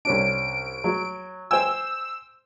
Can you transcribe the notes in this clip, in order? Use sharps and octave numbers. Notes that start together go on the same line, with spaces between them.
C2 C#4 D4 D7
F#3
C5 G5 G#5 E6